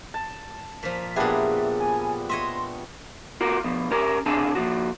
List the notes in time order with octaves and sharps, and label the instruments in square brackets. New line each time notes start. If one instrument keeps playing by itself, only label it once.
[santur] A5
[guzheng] A#2 F3 [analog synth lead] B6
[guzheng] A#2 G#4 [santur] G3 B3 D4 [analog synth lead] E5
[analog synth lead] G#5
[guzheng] C#5 D#5 E5 [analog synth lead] C6
[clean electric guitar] F4 F#4 A#4
B2 F3
C#4 G4 A#4 A#5
C3 D4 G#4 G#5 A5
A#2 F3 F#4